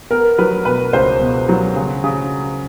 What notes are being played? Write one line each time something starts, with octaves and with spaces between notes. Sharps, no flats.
B3 A#4
F#3 B4
B2 B4
C#2 C5
B2
F#3
C#3
C#3